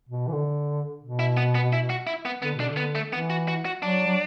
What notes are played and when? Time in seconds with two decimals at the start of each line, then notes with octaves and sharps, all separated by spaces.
0.09 B2
0.28 E3
0.32 D3
1.02 B2
1.19 E4
1.37 B3
1.55 B3
1.73 E4
1.90 F#4
2.07 E4
2.25 B3
2.42 D3 B3
2.55 B2 D4
2.69 D3
2.77 B3
2.95 A3
3.12 E3 B3
3.30 F#4
3.48 F#4
3.65 F#4
3.82 F#3 D4
4.07 F#3